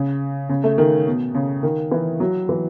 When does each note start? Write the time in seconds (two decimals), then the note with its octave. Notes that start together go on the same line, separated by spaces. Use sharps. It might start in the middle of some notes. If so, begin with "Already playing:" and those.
Already playing: C#3
0.49 C#3
0.64 A3
0.78 D#3
1.06 B2
1.34 C#3
1.63 D#3
1.91 E3
2.20 F#3
2.49 E3